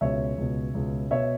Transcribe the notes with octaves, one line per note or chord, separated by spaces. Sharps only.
C#2 B2 C#5 E5
C#2 B2
C#2 B2
B2 C#5 E5